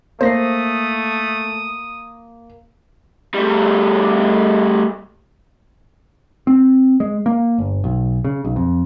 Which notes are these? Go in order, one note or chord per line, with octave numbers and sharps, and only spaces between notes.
A3 A#3 C5 D#6 A#6 C7
G3 A3
C4
G#3
A#3
G1
B1
C#3
B1
F2